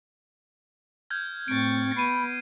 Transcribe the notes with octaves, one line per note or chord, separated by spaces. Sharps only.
F6 G6 G#6
A2 C4 C#6 A6 D7
B3 B5 C7 D#7